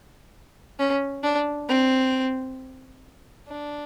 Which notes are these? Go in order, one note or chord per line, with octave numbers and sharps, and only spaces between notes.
C#4
D4
C4
D4